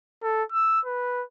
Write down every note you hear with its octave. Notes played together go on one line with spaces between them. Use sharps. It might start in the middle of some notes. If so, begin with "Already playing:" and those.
A4
E6
B4